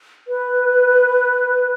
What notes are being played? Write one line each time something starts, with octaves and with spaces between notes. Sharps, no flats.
B4